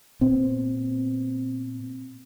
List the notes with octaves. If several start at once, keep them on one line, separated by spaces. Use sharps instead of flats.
A#2 B3 C4